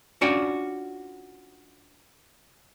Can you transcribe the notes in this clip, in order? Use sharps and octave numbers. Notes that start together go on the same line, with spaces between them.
C#4 D4 F4 F#4 D5 G5